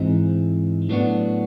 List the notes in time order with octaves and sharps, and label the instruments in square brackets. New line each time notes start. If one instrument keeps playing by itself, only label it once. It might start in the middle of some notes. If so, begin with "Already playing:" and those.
Already playing: [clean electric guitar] G#2 E3 G#3 C4 D#4
A2 F#3 B3 D4 F#4